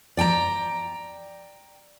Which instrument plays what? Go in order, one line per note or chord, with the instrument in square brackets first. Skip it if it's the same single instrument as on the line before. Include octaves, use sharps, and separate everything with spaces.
[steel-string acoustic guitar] D5 G5 A5 A#5